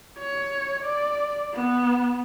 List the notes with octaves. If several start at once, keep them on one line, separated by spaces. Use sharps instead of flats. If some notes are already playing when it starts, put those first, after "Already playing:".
C#5
D5
B3